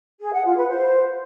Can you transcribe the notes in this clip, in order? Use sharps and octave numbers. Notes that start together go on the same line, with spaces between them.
G#4
F#5
F4
B4
C5